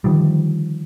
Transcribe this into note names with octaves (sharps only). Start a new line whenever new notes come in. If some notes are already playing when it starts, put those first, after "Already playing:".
D3 D#3 F3 G3